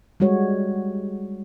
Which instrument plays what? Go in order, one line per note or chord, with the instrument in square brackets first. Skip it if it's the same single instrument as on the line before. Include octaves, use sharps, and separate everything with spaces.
[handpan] G3 G#3 F#4 C#5